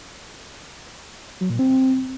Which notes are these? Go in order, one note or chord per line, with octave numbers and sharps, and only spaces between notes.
F#3
A#2
C4